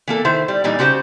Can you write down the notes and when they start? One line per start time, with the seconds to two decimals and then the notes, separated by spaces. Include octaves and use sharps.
0.08 E3 A#3 A4
0.25 D#3 E4 C5
0.48 G3
0.64 A#2 E3 G3 D#4
0.79 C#3 F#4 G4 C5